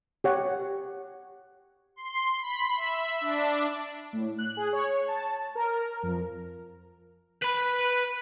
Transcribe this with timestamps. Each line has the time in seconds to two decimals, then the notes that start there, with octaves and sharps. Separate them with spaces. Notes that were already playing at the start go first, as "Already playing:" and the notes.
0.24 G4 C#5 F#5
1.96 C6
2.39 B5
2.77 E5
3.21 D4
4.13 A2
4.38 F#6
4.57 G#4
4.73 C#5
5.08 A5
5.55 A#4
6.03 F2
7.42 B4 B5